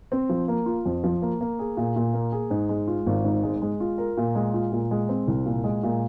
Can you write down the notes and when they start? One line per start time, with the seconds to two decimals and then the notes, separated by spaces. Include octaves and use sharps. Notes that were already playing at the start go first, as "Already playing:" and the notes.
0.12 C4
0.29 F3
0.48 A#3
0.66 F4
0.85 F2
1.04 F3
1.22 A#3
1.41 A#3
1.59 G#4
1.77 A#2
1.96 A#2
2.13 A#3
2.32 G#4
2.50 G#2
2.69 G#3
2.87 F4
3.07 G#1
3.24 G#2
3.43 G#3
3.62 G#3
3.80 F4
3.98 A#4
4.17 A#2
4.35 G#3
4.54 F4
4.72 A#2
4.91 G#3
5.09 C4
5.28 C2
5.46 A#2
5.64 G#3
5.83 A#2